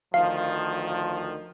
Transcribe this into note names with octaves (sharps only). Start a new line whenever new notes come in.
D2 D#3 F3 F5